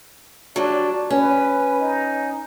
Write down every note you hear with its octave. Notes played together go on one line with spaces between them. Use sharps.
F#3 G3 D4
C#4 B4
D#4